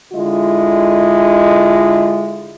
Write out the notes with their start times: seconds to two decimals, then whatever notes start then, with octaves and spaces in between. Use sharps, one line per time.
0.13 D3 G#3 E4 F4 D#5